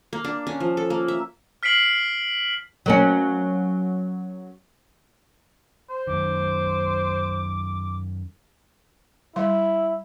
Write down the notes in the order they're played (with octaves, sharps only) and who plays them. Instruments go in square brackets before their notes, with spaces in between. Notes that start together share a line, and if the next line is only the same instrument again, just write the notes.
[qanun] A#3
D4
C#4
F3
A4
A#3
E5
[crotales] F6 B6 C7 D7 F#7
[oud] F#3 A#3 C#4
[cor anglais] C5
[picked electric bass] F#2 D#3 [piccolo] D6
[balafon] G3 C6 [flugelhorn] E4